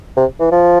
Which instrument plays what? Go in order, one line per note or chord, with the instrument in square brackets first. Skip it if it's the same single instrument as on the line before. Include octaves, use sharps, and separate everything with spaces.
[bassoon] C3
E3
F3